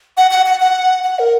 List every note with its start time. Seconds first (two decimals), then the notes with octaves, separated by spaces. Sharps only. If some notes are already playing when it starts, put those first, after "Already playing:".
0.17 F#5
0.31 F#5
0.46 F#5
0.60 F#5
1.04 F#5
1.19 A#4